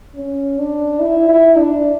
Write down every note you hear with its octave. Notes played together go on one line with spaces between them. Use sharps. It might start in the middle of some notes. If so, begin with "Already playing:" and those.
C#4
D4
E4
E4
D4